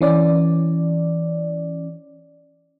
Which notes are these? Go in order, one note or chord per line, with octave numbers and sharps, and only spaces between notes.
E3 C#4 D5